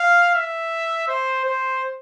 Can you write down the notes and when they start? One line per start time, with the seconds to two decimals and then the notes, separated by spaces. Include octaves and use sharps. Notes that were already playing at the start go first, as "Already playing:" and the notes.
Already playing: F5
0.35 E5
1.08 C5
1.45 C5